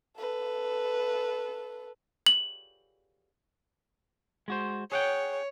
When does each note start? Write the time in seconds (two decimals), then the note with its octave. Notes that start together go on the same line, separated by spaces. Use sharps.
0.17 A4 B4
2.27 F#7
4.48 G#3 F#4 C5
4.92 G#4 C#5 F#5 G5